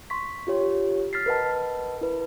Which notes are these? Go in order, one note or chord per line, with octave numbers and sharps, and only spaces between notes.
C6 C#6 B6
F4 G4 C#5
F6 A6 B6 C7
A#4 B4 D#5 F#5 A5
E4 B4